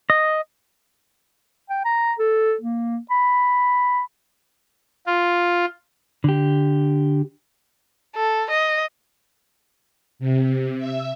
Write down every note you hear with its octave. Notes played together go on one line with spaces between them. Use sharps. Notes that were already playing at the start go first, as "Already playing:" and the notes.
D#5
G5
A#5
A4
A#3
B5
F4
D3 G4
A4
D#5
C3
E5